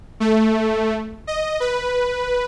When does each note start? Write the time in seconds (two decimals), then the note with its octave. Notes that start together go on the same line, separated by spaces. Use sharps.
0.20 A3
1.27 D#5
1.60 B4